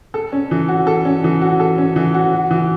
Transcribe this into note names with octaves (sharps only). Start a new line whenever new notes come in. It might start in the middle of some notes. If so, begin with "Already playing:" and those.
A4
C#4
E3
F#4
A4
C#4
E3
F#4
A4
C#4
E3
F#4
F#4
E3